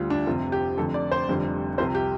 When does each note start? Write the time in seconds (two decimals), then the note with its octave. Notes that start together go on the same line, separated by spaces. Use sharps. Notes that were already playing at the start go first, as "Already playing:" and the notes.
Already playing: D2 D3 G3 F4
0.10 D4
0.27 F1 F2 C3 F4
0.52 G4
0.77 F1 F2 D3 A4
0.94 D5
1.11 C5
1.28 F1 F2 D3 G3
1.78 C2 C3 F3 C5
1.95 G4